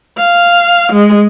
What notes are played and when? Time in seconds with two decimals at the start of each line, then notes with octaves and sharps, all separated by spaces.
0.18 F5
0.92 G#3